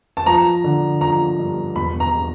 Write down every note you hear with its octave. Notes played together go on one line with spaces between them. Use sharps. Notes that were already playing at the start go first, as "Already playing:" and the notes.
A5
F3 A#5
D3
F3 A#5
G2
E1 B5
A#5